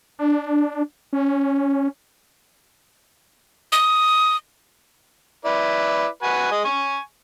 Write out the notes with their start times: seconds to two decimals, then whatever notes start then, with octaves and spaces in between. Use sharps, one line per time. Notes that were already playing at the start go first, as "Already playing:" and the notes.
0.19 D4
1.13 C#4
3.72 D#6
5.45 E4 B4 D5
6.23 F#4 B4 G#5
6.52 G#3 D#5
6.65 G#5 C#6